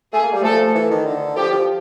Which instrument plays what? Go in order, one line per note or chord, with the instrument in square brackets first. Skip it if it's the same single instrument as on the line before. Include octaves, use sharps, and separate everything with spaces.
[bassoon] A3 [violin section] G#4
[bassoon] A#3
G3
[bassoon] F3 [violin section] A3 A4
[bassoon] E3
D#3
D3
[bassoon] F3 [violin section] G4
[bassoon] F3